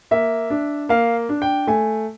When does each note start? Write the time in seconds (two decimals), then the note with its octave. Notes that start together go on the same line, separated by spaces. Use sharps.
0.11 A#3 E5
0.50 D4
0.89 A#3 F5
1.29 D4
1.42 G5
1.67 A3 G#5